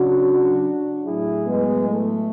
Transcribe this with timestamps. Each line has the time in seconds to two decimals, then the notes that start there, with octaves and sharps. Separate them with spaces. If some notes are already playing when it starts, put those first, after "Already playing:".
Already playing: C#3 F#3 D4 F#4
1.06 A2 F#3 E4 G#4
1.47 G#3 B3
1.88 A3